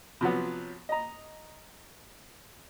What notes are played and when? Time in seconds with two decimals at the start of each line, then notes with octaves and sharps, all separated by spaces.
0.21 C3 F3 F#3 B3
0.89 D#5 A#5